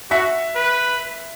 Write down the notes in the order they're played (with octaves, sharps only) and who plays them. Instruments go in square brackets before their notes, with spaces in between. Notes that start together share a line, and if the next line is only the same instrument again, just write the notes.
[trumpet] F#4 [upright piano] E5
[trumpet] B4